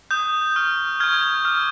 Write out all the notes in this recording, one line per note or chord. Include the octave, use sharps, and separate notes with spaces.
D#6 G6
C#6 F6
C#6 F6 G#6
D6 F6